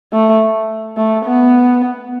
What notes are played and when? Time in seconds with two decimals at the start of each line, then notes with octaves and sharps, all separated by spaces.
0.13 A3
0.97 A3
1.25 B3